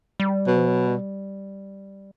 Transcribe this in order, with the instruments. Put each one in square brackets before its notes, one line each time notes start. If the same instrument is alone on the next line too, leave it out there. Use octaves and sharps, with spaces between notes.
[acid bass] G3
[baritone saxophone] B2 [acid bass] F#3
[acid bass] F3
F#3
G3